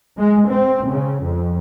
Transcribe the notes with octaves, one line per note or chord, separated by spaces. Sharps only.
G#3
C4
C#3
F2